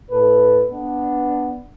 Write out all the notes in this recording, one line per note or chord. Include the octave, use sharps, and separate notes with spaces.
A2 A4 B4
B3 D4